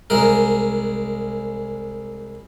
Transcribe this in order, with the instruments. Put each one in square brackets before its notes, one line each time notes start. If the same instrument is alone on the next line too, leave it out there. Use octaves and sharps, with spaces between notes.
[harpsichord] C2 G#3 A#4